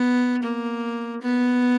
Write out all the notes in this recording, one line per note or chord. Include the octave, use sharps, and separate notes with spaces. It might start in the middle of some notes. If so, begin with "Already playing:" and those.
Already playing: B3
A#3
B3